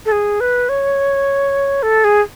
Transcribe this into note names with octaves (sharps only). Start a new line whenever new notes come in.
A4
G#4
B4
C#5
A4
G#4